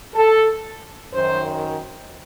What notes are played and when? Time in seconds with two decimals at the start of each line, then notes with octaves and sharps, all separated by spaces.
0.15 A4
1.13 F#2 D#3 C5